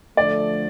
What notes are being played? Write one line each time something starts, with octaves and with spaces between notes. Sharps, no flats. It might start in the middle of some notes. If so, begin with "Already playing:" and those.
D3 F3 A3 D5